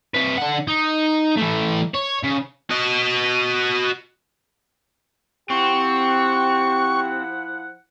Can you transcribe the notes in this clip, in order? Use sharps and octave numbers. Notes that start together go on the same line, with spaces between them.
C3 B4
D3 F#5
D#4
E3 A3
C#5
C#3
F#4 D#5
F3 C4 E4 G4 F#5 C#6